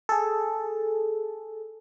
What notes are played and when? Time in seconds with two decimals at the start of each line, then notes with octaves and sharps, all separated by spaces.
0.09 G#4 A4